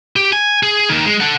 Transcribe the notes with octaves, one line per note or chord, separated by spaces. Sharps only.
G4
G#5
G#4
D#3 A#3
G#3
A4 F#5